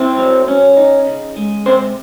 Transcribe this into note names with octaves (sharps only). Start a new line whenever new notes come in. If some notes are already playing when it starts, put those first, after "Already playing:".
Already playing: C4 E4 C5
F#3
C#4
D#4
C#3
G#3
C3 C4 C5